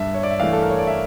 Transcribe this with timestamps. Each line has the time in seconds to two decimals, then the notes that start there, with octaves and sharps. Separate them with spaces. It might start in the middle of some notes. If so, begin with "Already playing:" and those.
Already playing: G2 E5
0.14 C#5
0.23 D5
0.31 E5
0.40 E3 A3 F5
0.53 A4
0.62 A#4
0.70 C#5
0.78 D5
0.87 E5